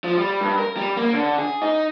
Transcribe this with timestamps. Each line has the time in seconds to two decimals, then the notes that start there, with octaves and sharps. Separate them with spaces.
0.04 F3
0.18 G3
0.41 G2
0.59 A#4
0.77 G3
0.97 A#3
1.13 D3
1.38 G#4
1.62 D#4